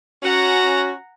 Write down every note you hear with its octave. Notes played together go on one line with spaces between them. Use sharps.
C#4 F#4 F#5 A#5